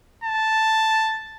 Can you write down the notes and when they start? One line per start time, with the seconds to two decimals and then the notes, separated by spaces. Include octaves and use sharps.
0.24 A5